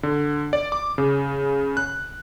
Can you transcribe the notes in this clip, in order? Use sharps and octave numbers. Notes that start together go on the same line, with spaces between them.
D3
D5
D6
C#3
F#6